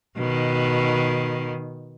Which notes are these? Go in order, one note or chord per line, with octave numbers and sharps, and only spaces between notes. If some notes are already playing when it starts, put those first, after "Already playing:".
B2 D#3